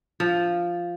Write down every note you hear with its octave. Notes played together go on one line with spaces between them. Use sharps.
F3